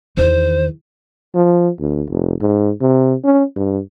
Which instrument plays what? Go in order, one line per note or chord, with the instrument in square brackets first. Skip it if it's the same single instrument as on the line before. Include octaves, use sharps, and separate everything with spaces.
[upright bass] E2 D#3 [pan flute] C5
[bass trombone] F3
D2
F1
G#2
C3
C#4
G2